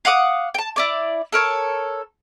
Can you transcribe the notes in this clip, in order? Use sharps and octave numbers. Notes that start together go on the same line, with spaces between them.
F5 F#5 D6 D#6
G5 A5
E4 D5 D6
A4 A#4 C#5